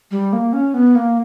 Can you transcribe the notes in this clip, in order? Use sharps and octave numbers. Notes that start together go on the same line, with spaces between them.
G3
A#3
C#4
B3
A#3